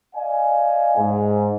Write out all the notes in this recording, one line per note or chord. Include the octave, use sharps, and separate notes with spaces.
D5 D#5 F5 G#5
G#2